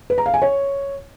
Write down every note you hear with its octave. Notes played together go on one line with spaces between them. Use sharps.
B4
A#5
F5
G#5
C#5